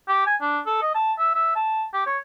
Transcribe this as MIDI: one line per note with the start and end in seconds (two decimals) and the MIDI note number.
0.08 0.26 67
0.26 0.35 80
0.41 0.59 62
0.66 0.81 69
0.82 0.91 75
0.95 1.13 81
1.18 1.31 76
1.35 1.54 76
1.55 1.85 81
1.94 2.03 67
2.06 2.18 73